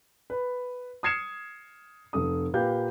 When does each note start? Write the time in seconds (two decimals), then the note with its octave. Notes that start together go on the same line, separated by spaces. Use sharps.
0.30 B4
1.03 D#6 F6 G#6 C7 C#7 E7
2.13 F1 A4 D#6
2.54 A#2 A#3 G4 B4 F5 G6